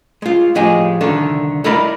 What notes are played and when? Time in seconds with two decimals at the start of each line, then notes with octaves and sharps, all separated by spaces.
0.22 G#3 F4
0.55 A2 F3 G#3 G4 D#5 G#5
1.01 C2 D3 D#3 A4
1.64 E4 A4 A#4 D5 D#5 B5